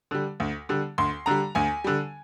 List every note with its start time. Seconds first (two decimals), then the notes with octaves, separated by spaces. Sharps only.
0.11 D3 G3
0.40 D2
0.69 D3 G3
0.98 D2 C6
1.26 D3 G3 A#5
1.55 D2 G#5
1.84 D3 G3